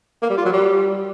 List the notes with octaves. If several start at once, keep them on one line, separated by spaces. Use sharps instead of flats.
A#3
G3
F4
F#3
G3